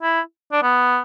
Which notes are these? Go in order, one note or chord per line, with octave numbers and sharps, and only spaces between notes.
E4
D4
B3